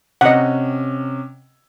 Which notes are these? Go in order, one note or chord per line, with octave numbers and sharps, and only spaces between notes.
C3 C#4 D#5 F#5